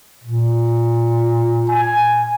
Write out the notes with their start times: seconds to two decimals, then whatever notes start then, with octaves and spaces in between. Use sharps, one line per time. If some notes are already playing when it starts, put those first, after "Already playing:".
0.24 A#2
1.68 G#5